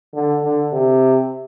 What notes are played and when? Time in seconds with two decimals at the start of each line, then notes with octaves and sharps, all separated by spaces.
0.14 D3
0.43 D3
0.73 C3